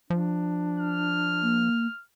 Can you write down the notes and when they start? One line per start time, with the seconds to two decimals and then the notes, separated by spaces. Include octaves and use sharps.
0.10 F3 D4
0.79 F6
1.42 A#3